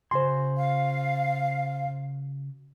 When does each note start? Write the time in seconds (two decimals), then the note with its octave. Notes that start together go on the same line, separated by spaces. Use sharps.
0.11 C#3 F#4 C5 G#5 C6
0.57 F5